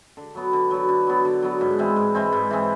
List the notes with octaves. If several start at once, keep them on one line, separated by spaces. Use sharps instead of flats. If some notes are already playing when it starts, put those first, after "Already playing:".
D3
F#3 B3
D3
F#3 B3
D3
F#3 B3
D3
F#3 B3
G#2
E3 G#3 C4
G#2
E3 G#3 C4
G#2
E3 G#3 C4